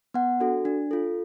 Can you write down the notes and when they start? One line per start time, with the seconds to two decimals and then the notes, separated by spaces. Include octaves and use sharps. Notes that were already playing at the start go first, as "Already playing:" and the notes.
0.14 B3 F#5
0.40 D4 F#4 A4
0.65 D4
0.91 F4 A4